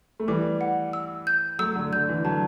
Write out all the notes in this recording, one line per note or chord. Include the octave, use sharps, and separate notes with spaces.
A3
E3 G3 D6
F#5
E6
G6
F#3 A3 E6
D3 F#3
D3 G6
E3
D3 F#3 A5